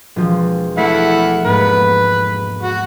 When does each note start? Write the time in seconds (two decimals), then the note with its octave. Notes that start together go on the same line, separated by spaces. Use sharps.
0.16 E1 F3
0.78 A3 E4 F#5 B6
1.45 G#2 A#3 B3 B4
2.63 F#4